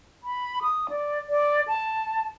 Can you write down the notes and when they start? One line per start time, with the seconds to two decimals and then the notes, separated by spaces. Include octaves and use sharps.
0.24 B5
0.62 D#6
0.90 D5
1.29 D5
1.68 A5